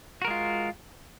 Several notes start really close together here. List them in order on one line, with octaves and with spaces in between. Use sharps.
F#4 A#4 G#3 F4